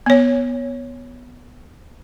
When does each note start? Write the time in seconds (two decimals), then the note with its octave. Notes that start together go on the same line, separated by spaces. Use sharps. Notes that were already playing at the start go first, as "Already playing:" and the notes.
0.06 B3 C#5